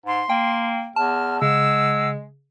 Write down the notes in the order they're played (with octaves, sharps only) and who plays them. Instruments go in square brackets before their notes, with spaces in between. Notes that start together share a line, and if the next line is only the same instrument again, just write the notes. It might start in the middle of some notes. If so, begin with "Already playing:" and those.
[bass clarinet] G#2 [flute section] C6
[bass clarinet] A#3 [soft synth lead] G5
[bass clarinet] E2 [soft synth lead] A5 [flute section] F6
[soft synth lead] C#3 [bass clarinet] G#3 [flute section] F#5 A5 E6